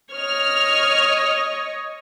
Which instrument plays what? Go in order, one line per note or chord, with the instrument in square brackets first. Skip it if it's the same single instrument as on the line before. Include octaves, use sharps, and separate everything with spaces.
[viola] C#5 D#5 [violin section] F6